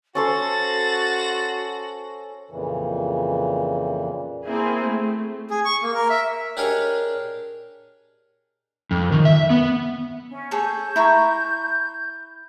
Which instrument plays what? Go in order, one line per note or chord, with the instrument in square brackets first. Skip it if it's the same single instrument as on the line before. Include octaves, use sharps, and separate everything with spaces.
[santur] C#4 A4 C5 [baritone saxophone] F#4 [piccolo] A6
[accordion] F2 A#2 C#3 E3
[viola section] A#3 C4 E4 G#4
A3
[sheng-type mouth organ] G#4
C#6
A#3
A#4
E5
[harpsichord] D4 G4 G#4 A#4 C#5 D#5
[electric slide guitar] F2
D#3
E5
B3
[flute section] C#4
[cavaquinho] G#4 A4 C#5 [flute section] G6
[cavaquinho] E4 A#5 C#6